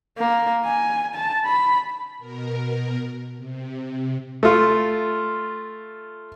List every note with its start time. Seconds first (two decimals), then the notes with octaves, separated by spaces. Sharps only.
0.19 A#3
0.65 G#5
1.15 A5
1.46 B5
2.19 B2 A#4
3.37 C3
4.43 A3 F4